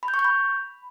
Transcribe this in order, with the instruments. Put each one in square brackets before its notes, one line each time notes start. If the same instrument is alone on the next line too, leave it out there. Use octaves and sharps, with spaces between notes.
[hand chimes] B5
G6
C#6
G6
B5